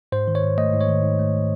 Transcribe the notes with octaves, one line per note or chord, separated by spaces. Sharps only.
G#2 C5
D#3
C#5
G#2
A3 D#5
G#2
C#5
D#3
G#2
A3